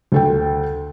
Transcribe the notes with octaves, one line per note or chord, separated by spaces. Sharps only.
D2 A4 G5